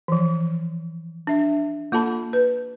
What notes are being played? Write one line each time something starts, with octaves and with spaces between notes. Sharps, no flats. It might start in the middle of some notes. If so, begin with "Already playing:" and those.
E3 F3
D4 E5
A#3 F4 A4 A5 B5
B4